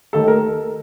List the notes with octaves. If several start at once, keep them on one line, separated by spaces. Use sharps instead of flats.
D#2 D#3 A3 A4
A#4